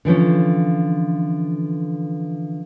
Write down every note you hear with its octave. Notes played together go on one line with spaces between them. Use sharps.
D3 E3 F3 C#4